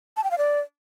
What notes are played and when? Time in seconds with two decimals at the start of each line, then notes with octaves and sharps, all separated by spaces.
0.17 A5
0.24 G5
0.31 F5
0.38 D5